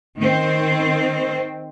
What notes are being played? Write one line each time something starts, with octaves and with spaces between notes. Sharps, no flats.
D#3 C4